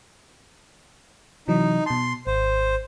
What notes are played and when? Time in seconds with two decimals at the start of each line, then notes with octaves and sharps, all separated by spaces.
1.48 C3 E3 F#3 D#4
1.86 B2 A5 C6
2.27 G#1 C5